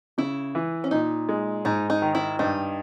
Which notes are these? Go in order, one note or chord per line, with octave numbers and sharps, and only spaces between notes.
C#3 E4
E3
C#4
A#2 D#4
G#3
G#2 D#4
D#4
D#3
E4
G2 D#4